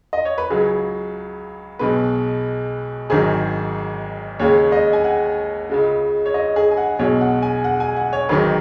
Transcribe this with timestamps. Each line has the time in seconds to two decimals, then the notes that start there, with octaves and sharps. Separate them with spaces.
0.13 D#5
0.25 C#5
0.38 B4
0.50 C#2 C#3 F#3 G#4
1.79 B1 B2 G#3 B4
3.10 G#1 G#2 D#3 F#3 G#4
4.40 D#2 C#3 G#3 C#5
4.72 D#5
4.93 G#5
5.04 F#5
5.70 C#2 C#3 G#3
6.26 C#5
6.34 D#5
6.56 G#4
6.71 G#5
6.77 F#5
6.99 B1 B2 G#3 C#5
7.21 F#5
7.42 G#5
7.64 F#5
7.80 G#5
7.96 F#5
8.13 C#5
8.29 G#1 G#2 D#3 F#3 B4